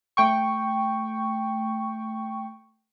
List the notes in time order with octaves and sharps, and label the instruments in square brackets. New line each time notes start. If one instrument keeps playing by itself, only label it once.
[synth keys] A3 G5 C#6